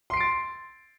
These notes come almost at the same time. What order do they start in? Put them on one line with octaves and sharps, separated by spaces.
C6 C7 D7 A6